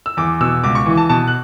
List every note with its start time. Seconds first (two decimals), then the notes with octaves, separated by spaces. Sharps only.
0.06 E6
0.17 E2 D6
0.40 B2 E6
0.64 C#2 D6
0.75 C#6
0.86 E3
0.97 A5
1.09 B2 A5
1.28 F#6